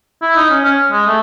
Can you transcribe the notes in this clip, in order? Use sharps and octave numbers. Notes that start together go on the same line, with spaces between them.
E4
D#4
C#4
C#4
G#3
A3